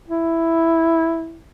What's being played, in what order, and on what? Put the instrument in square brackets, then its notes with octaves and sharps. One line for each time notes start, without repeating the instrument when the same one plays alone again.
[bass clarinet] E4